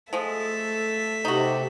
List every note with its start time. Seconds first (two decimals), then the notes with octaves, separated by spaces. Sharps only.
0.13 F3 G#3 A3 A4 E5
1.25 C3 D#4 F#4